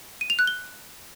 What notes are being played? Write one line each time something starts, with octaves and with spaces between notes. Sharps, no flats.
D#7
F7
F#6
G7